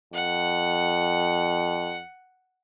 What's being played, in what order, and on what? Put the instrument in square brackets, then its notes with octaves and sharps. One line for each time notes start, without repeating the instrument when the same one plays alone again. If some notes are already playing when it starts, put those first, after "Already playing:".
[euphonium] F2 [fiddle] F#5